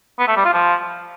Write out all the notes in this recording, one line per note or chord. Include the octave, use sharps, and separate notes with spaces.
B3
A3
G3
F4
F3